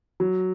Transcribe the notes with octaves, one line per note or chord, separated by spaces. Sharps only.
F#3